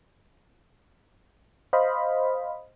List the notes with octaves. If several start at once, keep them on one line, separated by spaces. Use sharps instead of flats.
C5 D#5 F5 B5